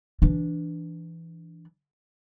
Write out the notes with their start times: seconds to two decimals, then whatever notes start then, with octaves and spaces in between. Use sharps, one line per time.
0.22 E3 D4